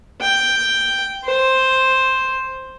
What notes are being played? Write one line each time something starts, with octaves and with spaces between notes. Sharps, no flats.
G5
C5